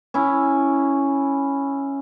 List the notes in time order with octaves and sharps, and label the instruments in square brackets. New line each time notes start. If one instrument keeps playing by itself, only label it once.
[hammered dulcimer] C#4 E4